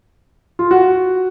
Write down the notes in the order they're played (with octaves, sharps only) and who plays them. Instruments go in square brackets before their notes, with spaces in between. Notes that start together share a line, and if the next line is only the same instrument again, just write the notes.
[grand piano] F4
F#4